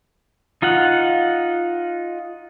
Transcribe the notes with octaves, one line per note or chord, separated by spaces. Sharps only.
D#4 F4 F5 F#5